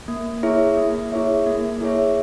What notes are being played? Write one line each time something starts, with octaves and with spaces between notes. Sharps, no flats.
A#3
E4 G#4 C#5 E5
A#3
E4 G#4 C#5 E5
A#3
E4 G#4 C#5 E5